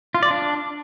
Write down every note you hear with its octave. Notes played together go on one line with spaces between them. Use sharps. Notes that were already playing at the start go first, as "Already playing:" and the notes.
F4
D5
D4